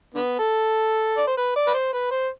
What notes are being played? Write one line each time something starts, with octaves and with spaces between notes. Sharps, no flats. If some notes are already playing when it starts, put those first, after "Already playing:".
D3 B3
A4
D5
C5
B4
D5
B4
C5
B4
C5